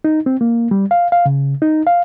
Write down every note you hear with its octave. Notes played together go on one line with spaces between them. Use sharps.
D#4
C4
A#3
G3
F5
F5
C#3
D#4
F5